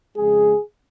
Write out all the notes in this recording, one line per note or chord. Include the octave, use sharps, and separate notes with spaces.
F2 C#3 G#3 G#4